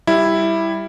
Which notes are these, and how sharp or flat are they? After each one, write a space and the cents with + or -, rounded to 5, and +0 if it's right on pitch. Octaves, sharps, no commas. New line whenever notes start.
G3 +0 E4 +0